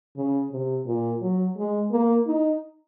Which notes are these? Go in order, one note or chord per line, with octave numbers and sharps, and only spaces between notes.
C#3
C3
A#2
F#3
G#3
A#3
D#4